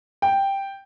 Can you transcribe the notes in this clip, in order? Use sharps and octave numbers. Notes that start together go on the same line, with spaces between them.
G5